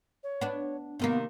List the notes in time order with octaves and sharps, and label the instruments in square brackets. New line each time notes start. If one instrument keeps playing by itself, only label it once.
[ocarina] C#5
[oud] B3 D4
[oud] C3 D#3 A#3 [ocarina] B3